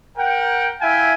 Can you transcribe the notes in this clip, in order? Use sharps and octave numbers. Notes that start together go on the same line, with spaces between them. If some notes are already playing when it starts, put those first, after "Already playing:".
A#4 F#5 G5
E4 E5 F5 G5 G#5